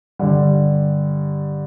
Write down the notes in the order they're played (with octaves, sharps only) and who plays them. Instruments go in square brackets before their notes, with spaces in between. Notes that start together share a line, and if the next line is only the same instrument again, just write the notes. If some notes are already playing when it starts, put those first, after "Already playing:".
[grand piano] G2 D3 G3